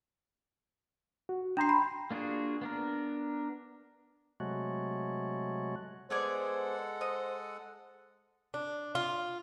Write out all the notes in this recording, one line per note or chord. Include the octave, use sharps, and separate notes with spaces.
F#4
D4 G5 A#5 C6 C7
B5
A#3 D4 F4 F#4 G#4
B3 D4 A#4
C3 F#3 G#3 A3 F#4
G#3 B3 G#4 A4 C5 D5 F#5
C5 D#5
D4
F4